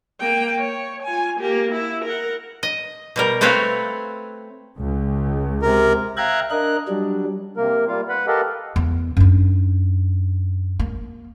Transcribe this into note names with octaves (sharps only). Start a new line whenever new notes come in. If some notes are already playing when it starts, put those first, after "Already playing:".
A#3 G5
C#5
F4 G#5
A#3 G4
E4
A#4 F#5
D#5
B2 G3 A#4
A3 C4 F#4 B4 C#5 F5
C#2
C3 A#4
E5 F5 G5 A#5 F#6 G#6
D4 A#4 D#5 F#6
F#3 G3 D4
C3 A#3 A#4
G3 A#3 F4 F5
B4 F#5 B5
G4 A4 A#4 D#5 F5 F#5
E2
F#2 D4
A#3